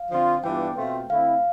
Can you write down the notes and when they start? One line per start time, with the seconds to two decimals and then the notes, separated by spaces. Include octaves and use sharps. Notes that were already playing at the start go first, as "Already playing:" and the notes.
Already playing: F5
0.12 D3 F3 C4 F4
0.44 G2 E3 B3 D4 F4 G5
0.76 B2 A3 C4 F4
1.09 D3 A3 C4 E4 F5